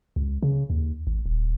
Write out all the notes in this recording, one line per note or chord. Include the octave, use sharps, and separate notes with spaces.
C#2
C#3
D#2
G#1
D#1